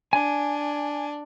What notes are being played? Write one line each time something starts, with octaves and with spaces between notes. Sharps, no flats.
D4 G#5